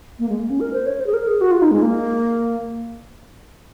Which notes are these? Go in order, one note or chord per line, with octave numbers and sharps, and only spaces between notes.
A#3
G#3
A#3
C#4
A#4
C5
C#5
C5
G#4
A#4
G#4
F#4
F4
D#4
G#3
A#3